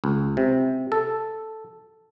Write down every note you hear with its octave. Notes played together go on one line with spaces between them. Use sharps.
C#2
C3
A4